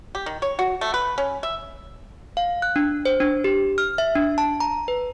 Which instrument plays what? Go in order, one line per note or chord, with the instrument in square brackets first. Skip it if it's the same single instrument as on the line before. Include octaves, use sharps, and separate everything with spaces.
[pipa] G4
D#3
C#5
F#4
A3
B4
C#4
E5
[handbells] F5
F#6
D4
C5
D4
G4
F6
E5
D4
A5
A#5
B4